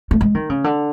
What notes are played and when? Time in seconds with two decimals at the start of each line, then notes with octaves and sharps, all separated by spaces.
0.11 A3
0.21 G#3
0.35 D#3
0.50 C#3
0.64 D3